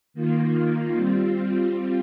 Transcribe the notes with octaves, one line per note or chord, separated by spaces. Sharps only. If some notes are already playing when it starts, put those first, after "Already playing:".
D#3 A#3 F4
G3 C4 F4